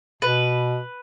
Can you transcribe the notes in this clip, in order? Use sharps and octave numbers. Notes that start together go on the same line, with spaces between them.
B2 B4